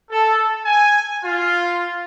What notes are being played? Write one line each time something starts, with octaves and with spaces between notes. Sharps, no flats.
A4
G#5
F4